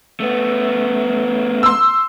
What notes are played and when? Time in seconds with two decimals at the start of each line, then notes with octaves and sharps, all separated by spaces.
0.20 A3 B3
1.63 C6 E6